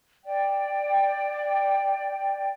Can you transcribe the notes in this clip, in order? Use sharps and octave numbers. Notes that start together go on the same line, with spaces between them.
D5 G5